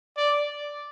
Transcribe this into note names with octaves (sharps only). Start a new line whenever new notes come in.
D5